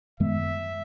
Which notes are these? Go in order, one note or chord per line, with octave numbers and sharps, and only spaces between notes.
F#2 D#3 G#3 B3 E5